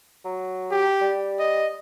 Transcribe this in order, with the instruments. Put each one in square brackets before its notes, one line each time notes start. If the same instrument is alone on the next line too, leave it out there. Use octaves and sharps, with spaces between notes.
[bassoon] F#3
[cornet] G4
[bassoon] G3
[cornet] D#5